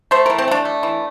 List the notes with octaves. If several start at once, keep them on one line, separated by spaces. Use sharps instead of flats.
A3 C5
E3 A#4
C4
A3 D4
A3
E3